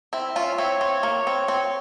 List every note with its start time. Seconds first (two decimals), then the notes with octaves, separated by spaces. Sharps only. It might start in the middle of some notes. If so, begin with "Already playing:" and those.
0.13 C4 E4 E5
0.36 C#4 F4
0.58 C4 E4 C#5
0.81 C4
1.03 A#3
1.27 C4
1.48 C4